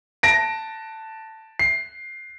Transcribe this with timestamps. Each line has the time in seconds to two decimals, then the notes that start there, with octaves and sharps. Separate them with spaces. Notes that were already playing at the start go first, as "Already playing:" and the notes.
0.23 A5 A#6 D7
1.59 C7